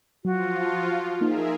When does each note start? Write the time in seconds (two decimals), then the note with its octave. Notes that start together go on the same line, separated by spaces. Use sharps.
0.25 F3 F#3 F4 F#4
0.66 A5 C6
1.21 A#3 D#4 G#4 A#4 E5